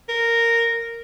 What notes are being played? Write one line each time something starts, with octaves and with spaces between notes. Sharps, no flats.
A#4